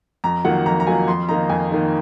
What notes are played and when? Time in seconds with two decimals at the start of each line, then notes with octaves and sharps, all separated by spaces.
0.24 F2 A#5
0.45 D#3 F#3 A#3 F4 F#5
0.66 F2 A#5
0.80 A#5
0.87 D#3 F#3 A#3 F4 G#5
1.08 F2 C6
1.29 D#3 A#3 D#4 A#5
1.49 F2 G#5
1.71 D#3 A#3 D#4